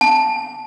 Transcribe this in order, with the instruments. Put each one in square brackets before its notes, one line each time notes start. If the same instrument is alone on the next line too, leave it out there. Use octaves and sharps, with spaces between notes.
[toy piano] A5